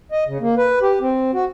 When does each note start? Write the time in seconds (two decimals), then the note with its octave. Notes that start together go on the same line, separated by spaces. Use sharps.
0.12 D#5
0.27 C#3
0.40 A#3
0.57 B4
0.82 G4
1.01 C4
1.34 F#4